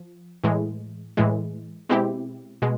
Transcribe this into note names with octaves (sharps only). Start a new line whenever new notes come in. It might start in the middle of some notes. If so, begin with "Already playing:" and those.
Already playing: F3
A2 E3 G#3
A2 E3 G#3
B2 G#3 C4 E4 G4
B2 G#3